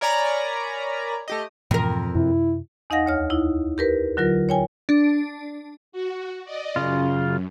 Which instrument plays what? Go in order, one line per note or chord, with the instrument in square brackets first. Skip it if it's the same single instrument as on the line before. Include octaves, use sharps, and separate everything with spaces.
[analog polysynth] A#4 C#5 D5 G#5 A#5 B5
A3 G4 D#5
[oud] F2 A#4 [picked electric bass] G#2 B2 E3
[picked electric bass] F#2 C3 [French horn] E4
[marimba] E2 D#4 D#5 F5 F#5 A#6
D2 C#5 F6
D#4 E4
G4 A#4 B4
D3 F#3 F4 A#4
C#5 G5 G#5
[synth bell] D4
[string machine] F#4
D5 D#5
[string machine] F#2 [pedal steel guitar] C#3 F4